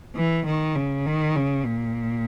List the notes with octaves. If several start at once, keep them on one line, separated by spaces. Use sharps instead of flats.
E3
D#3
C#3
D#3
C#3
A#2